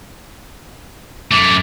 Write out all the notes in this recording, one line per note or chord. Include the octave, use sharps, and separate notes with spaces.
F#2 A3 D6